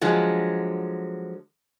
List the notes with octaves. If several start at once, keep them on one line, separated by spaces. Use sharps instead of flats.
D3 F3 F#3 G#3